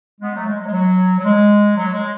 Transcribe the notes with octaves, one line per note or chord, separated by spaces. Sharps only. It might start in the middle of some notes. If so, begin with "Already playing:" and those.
G#3 B3
F#3 A3
G#3
F#3
G#3
F#3
F#3
G#3
F#3
G#3